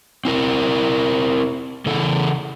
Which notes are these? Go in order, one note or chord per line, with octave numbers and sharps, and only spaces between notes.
C4 E4 A#4
C#3 E3 A4